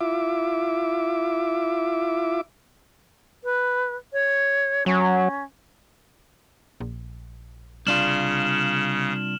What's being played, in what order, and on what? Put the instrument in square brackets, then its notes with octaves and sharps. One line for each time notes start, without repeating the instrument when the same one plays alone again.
[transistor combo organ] E4 F4 E5 D6
[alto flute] B4
C#5
[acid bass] F#3 [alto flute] C#4
[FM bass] A#1
[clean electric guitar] C2 D4 F4 [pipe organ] C#3 [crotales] F6 E7 F#7